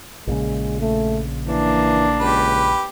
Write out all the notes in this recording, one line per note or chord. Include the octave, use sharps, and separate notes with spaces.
A#1 A#2 C#3 G#3
A3
E3 A#3 D4
C#2 G4 B4